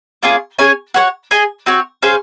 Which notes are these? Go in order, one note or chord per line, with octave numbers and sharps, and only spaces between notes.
A#3 C#4 F4 G#4
C#4 G#4 C#5 G#5
F#4 C#5 F#5
G#4 D#5 G#5
C4 F#4 C#5
C#4 G#4 C5 F5